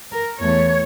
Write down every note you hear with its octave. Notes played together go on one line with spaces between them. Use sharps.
A#4
E2 E3 A3 C#5